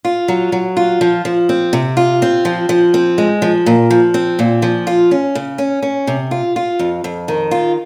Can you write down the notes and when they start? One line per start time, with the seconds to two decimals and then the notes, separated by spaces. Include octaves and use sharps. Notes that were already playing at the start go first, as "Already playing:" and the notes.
0.05 F4
0.28 F#3
0.52 F#3
0.77 F4
1.01 F3
1.25 F3
1.49 C4
1.73 C3
1.97 F4
2.22 C4
2.45 F3
2.69 F3
2.94 C4
3.18 G#3
3.42 F3
3.66 A#2
3.90 F3
4.14 C4
4.39 A#2
4.62 F3
4.87 F4
5.11 C#4
5.35 C#3
5.58 C#4
5.82 C#4
6.07 C3
6.31 F4
6.56 F4
6.79 F2
7.04 F2
7.28 D#3
7.51 F4